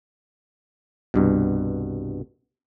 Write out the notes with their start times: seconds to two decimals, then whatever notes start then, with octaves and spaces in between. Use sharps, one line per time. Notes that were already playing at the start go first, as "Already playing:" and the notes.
1.14 C2 G2 B2